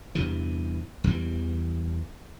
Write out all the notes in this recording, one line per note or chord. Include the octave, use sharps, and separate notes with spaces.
E2 G2 C3 E3
E2 E3 G3